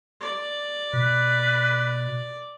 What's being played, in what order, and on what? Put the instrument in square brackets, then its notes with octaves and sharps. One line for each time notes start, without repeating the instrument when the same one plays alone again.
[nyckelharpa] D5
[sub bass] B2 [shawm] B4